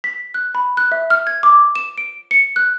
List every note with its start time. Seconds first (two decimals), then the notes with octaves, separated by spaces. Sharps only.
0.04 B6
0.34 F#6
0.55 B5
0.77 F#6
0.92 E5
1.10 F6
1.27 G#6
1.43 D6
1.75 E7
1.98 D7
2.31 C#7
2.56 F#6